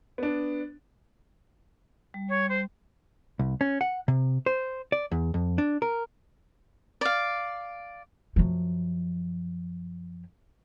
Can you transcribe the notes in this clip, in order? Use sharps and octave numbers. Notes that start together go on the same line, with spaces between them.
B3 D4
G3
C#5
C5
C2
C#4
F#5
C3
C5
D5
E2
F2
D4
A#4
D5 F5
F#2 F3